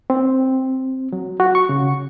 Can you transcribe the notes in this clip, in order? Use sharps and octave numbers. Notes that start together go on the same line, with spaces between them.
C4
F#3
F#4
C#6
C#3